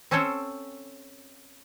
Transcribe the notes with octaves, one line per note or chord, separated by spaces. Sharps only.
C4 C#4 A4 C5 C#5